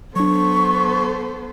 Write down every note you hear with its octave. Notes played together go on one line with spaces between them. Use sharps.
F#3 B3 D4 A4 C5 C#6